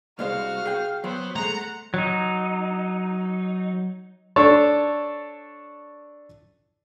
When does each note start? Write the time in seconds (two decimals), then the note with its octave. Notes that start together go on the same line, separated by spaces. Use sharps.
0.19 C2 G#3 F#4 C5 F5 F6
0.66 G#4 G5
1.04 F#3 B3 C5
1.36 G#3 A3 F#5 A#5
1.94 F#3 D#4
4.36 D4 A4 C#5